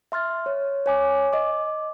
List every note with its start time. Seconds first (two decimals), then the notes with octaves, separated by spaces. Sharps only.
0.12 E5 C6 F6 A6
0.46 C#5
0.86 C#5 G#5 D6
1.33 D#5 D6